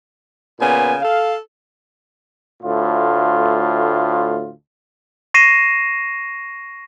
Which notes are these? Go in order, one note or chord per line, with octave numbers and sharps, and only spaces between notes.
A#2 C#3 B3 G#5
A4 F5
D2 A2 F4
C#6 A#6 C7 D#7 E7